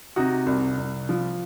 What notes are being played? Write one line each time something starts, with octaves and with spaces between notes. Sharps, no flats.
C3 D#4 F#4
C2
C2
F3